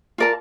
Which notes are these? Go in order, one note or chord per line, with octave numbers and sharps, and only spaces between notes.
F4 A#4 D5 A5